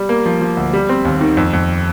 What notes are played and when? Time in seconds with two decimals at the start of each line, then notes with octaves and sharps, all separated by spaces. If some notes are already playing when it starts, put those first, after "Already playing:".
Already playing: G3
0.09 A#3
0.26 F3
0.41 F3
0.57 D2
0.73 G3
0.89 C4
1.05 D#2
1.21 D#3
1.37 F2
1.53 F2